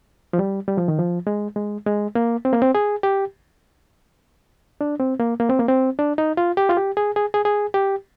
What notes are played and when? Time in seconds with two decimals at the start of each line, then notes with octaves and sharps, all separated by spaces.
0.33 F3
0.39 G3
0.68 G3
0.77 F3
0.88 D#3
0.98 F3
1.27 G#3
1.56 G#3
1.86 G#3
2.15 A#3
2.45 C4
2.53 A#3
2.62 C4
2.75 G#4
3.03 G4
4.81 D4
5.00 C4
5.20 A#3
5.40 A#3
5.49 C4
5.59 A#3
5.69 C4
5.99 D4
6.18 D#4
6.37 F4
6.57 G4
6.69 F4
6.77 G4
6.97 G#4
7.16 G#4
7.34 G#4
7.45 G#4
7.74 G4